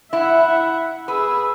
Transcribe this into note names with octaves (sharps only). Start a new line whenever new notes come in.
E4 E5 F#5
G#4 B4 E6